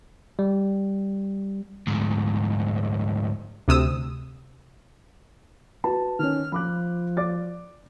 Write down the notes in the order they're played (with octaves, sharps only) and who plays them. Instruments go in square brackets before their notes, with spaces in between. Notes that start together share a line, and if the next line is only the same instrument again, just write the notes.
[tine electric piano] G3
[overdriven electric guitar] D2 G#2
[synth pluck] D2 C3 D#6 E6
[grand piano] F#4 B4 A5
[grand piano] D#3 C#4 [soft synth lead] F6
[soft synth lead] F3 [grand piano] B5 D6 F#6
[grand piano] D5 D6 A6